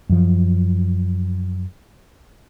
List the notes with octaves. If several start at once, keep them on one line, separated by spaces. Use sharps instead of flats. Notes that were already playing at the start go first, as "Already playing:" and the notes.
F#2 F3